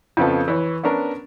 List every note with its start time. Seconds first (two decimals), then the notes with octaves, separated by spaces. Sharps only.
0.17 F2 C#3 F3 B3 A4
0.48 E3 C#5
0.84 B3 C#4 D4 A#4